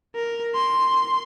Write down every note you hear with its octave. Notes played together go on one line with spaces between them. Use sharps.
A#4
C6